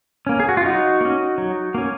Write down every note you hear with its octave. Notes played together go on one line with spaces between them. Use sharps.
A#3 C#4
G#4
F#4
F4
F#3 D#4 F#4
A#3 C#4
F#3
A#3 C#4